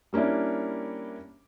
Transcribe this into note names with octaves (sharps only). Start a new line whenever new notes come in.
G3 A#3 C#4 D4 E4